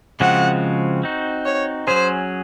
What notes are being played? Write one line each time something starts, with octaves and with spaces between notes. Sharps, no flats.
C#3 F3 G#3 C4 F#4 F#5
C4 D#4 F#4
C#5
F#3 C#4 G#4 C5